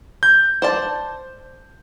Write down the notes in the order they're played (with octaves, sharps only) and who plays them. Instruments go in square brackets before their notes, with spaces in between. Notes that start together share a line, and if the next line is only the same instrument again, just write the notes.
[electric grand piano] G6
[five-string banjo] C5 D5 A5